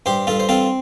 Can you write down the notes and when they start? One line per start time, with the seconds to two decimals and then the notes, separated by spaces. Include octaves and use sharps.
0.06 G2 G4 C5
0.27 G2 F4 A4
0.40 C5
0.49 C4 F4 A4